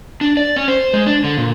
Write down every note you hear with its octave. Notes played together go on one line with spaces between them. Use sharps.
D4
D5
C#4
C5
G#3
D4
D3
A#2